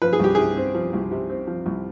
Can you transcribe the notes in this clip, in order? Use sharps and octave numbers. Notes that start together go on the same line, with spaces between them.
F3 B4
G#4
C2 G4
C3 G#4
C4
F3
C2
C3
C4
F3
C2